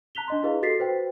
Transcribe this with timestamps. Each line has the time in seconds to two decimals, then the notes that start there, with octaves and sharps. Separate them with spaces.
0.15 A5 A#5 F#6 B6 F7 G7
0.28 D4 D#5 C6
0.43 E4 G#4 B4 D#5 F5
0.62 F#4 G4 A4 A6 B6 C7
0.79 F#4 B4 C5 G5